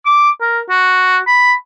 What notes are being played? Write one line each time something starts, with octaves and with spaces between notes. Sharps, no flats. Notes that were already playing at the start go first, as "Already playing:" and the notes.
D6
A#4
F#4
B5